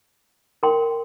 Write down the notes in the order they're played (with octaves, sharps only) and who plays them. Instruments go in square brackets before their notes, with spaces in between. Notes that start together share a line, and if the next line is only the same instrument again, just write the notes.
[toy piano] A#4 G5 C6